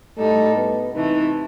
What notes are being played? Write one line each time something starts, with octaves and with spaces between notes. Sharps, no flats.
A2 G3 A3 D#4 A4
B3
C3 E3 A3 D#4